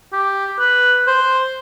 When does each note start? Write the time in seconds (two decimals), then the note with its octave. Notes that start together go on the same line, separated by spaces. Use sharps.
0.13 G4
0.60 B4
1.07 C5